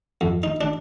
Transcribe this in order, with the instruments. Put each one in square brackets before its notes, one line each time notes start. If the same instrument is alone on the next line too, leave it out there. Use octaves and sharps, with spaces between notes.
[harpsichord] F2
D#4
D4